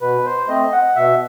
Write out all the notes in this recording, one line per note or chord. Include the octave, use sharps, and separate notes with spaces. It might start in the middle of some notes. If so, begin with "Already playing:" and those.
B2 B4
C5
A3 C4 D#5
F#5
B2 E5